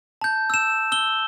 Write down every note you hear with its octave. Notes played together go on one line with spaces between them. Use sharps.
A5 G6
E6 E7
E6 G7